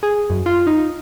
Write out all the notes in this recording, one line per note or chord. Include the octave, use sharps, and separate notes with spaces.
G#4
F#2
F4
D#4